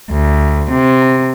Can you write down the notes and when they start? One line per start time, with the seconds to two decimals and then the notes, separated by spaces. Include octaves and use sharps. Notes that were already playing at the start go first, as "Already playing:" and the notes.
0.11 D2
0.71 C3